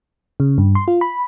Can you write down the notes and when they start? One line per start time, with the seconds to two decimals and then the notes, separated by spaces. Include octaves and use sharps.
0.40 C#3
0.58 G2
0.75 C6
0.88 F4
1.01 B5